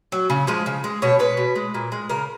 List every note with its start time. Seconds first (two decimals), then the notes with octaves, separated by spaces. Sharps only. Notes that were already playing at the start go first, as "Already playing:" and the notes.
0.12 F#3
0.30 C#3
0.47 F3 G#3
0.66 C#3
0.84 G#3
1.02 B2 C#5
1.19 G#3 B4
1.37 B2
1.56 G#3
1.74 A#2
1.92 G#3
2.09 C#3 A#4